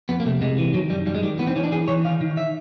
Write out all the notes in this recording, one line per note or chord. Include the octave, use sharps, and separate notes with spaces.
F2 B3
A#3
C3 A3
C3 G#3
E3
D#3 F#3
F#2 G3
F#2 G3
G#3
D#3 G3
E3 B3
C4
E3 C#4
D4
E3 G#4
E3 C#5
D#3 F5
D#3
E5